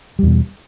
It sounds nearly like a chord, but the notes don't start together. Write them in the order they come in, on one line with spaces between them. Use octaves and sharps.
G3 E2 B2